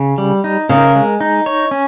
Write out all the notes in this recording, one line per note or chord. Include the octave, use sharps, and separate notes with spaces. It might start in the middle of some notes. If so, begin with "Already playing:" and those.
Already playing: C#3
G3
D#4
C#3 A#4
G#3
D#4
C#5
C#4